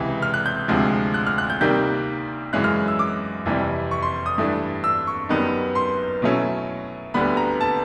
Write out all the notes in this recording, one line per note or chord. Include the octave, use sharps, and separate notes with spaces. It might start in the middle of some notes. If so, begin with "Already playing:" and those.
Already playing: C#2 C3 E3
F6
F#6
G6
D2 C3 F3 G#3
F#6
F6
F#6
G6
C3 D#3 G3 A#3 G6
F#2 C#3 E3 G#3 C#4 F#6
F6
E6
D6
F2 C3 E3 G3
C#6
C6
D#6
G2 E3 A3 D4
E6
C#6
F#2 D#3 G3 B3 D#4
C6
B2 F#3 A3 C#4 E4
D2 D3 G3 B3 B5
A#5
A5